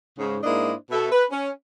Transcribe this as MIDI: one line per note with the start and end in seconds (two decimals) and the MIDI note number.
0.18 0.37 44
0.18 0.37 49
0.44 0.74 44
0.44 0.74 58
0.44 0.74 62
0.44 0.74 64
0.44 0.74 72
0.44 0.74 75
0.91 1.08 47
0.91 1.08 69
0.91 1.08 76
1.12 1.25 71
1.31 1.50 61